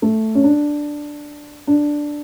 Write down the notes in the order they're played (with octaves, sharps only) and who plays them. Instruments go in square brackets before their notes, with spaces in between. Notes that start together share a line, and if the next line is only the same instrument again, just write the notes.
[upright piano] A3
C#4
D4
D4